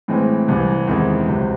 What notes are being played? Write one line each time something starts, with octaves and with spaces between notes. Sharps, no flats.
A2 E3 G#3 C4
C2 C3 E3
E2 D#3 G#3 C4 E4
C#2 C3 F#3